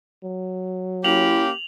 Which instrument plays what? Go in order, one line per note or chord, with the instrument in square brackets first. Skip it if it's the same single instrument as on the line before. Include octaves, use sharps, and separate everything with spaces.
[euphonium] F#3
[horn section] A#3 C#4 G4 [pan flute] E4 [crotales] F7 F#7